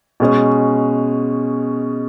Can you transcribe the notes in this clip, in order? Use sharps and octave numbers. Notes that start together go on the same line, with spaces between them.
B2 G#3 C#4